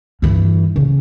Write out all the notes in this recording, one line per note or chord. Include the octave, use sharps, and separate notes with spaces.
G2 E3
C#3